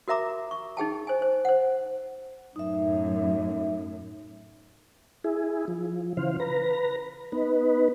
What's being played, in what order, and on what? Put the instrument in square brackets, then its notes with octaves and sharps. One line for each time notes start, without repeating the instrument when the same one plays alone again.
[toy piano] F#4 A#4 E5 A#5 D6
C#6
D#4 G#4 G5 A5
C5 G#5
C5
C5 F#5
[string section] F#2 A2 [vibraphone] D#4 E5
[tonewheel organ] E4 G#4
F3
C#3 E3 C5 F5
B4 A#5
B3 D#4 B4